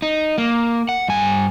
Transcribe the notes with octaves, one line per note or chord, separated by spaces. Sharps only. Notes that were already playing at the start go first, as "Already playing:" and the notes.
D#4
A#3
F#5
G2 G#5